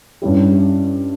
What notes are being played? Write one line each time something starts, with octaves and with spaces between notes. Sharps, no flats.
G2 G3 C#4 E4 G4